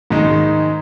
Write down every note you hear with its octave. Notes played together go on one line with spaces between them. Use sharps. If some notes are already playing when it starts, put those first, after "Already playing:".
G#2 D#3 G#3 D#4